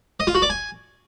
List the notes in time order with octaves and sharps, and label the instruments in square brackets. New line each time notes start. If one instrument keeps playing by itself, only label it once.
[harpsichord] D#5
F4
F#4
D5
G#5